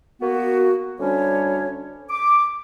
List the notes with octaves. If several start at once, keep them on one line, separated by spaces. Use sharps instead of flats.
A#3 B3 F#4
D2 G3 C#4 D4 C#5
D6